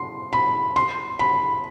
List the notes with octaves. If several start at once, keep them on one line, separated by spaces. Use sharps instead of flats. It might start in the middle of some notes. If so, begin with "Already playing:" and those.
Already playing: C6
B5
C6
B5